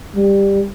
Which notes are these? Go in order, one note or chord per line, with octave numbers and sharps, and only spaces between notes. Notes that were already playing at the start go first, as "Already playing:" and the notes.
G3